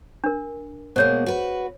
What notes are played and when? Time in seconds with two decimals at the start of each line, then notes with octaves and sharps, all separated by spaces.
0.24 D4 A#4
0.96 B2 G#3 A#3 C5 C#5
1.26 F#4 B4